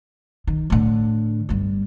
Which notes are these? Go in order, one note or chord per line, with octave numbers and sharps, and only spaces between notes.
D#3
A2 D3
G1 G3